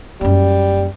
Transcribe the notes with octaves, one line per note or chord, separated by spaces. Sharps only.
F#2 G3 A#3